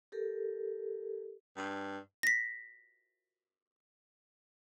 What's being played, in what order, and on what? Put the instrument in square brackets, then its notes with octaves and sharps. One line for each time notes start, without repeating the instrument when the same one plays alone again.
[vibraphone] G4 A4 A#4
[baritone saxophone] G2
[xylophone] A#6 B6